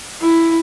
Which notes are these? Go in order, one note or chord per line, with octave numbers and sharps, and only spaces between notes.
E4